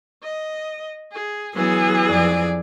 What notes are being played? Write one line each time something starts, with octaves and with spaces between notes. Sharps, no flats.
D#5
G#4
E3 F#3 B3 G#4
F2 D5